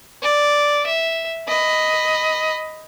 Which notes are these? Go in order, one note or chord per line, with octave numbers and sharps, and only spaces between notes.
D5
E5
D#5 B5